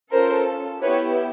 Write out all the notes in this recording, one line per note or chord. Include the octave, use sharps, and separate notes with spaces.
C#4 F4 A4 A#4 C5
B3 E4 G4 B4 C#5